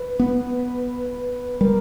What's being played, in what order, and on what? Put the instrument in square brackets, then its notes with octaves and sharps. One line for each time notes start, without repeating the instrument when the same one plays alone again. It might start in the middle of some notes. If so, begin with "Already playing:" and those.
Already playing: [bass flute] B4
[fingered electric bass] B3
[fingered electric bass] G3 [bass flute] A#4